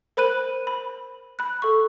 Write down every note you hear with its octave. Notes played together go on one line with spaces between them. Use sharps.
A#4 C5 B5 F#6 D#7 F#7
B5
B5 F#6
A4 C#6